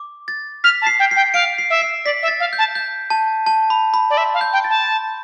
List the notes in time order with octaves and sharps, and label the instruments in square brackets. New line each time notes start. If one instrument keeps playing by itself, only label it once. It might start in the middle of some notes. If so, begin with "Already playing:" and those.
Already playing: [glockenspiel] D6
A6
[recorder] F6 [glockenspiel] B6
[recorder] A5
[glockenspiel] C7
[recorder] G5
[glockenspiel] C7
[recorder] G5
[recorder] F5 [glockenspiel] D7
[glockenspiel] C7
[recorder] E5
[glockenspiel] C7
[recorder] D5 [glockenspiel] B6
[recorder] E5
[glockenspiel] A6
[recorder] F5
[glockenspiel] G6
[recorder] A5
[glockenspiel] G6
A5
A5
B5
B5
[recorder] D5
[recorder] E5 [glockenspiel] C6
[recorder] F5
[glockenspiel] G6
[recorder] G5
[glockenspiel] A6
[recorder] A5